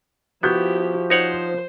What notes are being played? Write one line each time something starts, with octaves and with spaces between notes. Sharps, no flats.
F3 B3 E4 F#4 G4 G6
D#4 C5 C#5 F#5